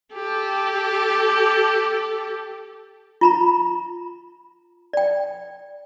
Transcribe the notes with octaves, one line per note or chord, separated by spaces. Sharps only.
G4 A4
F4 A#5 B5
D5 G5